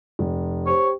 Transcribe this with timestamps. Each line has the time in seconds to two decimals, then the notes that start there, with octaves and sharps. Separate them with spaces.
0.19 F1
0.66 G4 C5 C#5